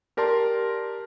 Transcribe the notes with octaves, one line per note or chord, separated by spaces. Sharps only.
G4 A#4 D5 A5 C6